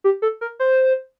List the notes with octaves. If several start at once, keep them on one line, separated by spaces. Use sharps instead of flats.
G4
A4
A#4
C5